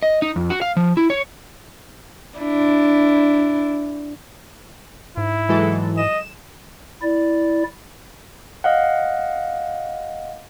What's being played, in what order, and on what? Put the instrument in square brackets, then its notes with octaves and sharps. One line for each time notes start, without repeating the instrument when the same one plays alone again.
[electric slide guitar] D#5
D#4
F2
F#4
F5
F3
E4
C#5
[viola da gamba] D4 E4
[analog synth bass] G#2 [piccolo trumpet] E4
[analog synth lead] E3 [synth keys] F#3 G#3 A4
[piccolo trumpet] D#5 [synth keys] E7
[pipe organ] E4 D5
[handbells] D#5 F5 F#5